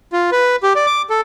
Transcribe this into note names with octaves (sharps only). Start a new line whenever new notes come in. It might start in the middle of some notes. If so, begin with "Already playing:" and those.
F4
B4
G4
D5
D6
A4